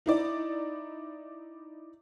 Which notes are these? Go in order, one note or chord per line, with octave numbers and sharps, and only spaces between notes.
D#4 E4 D5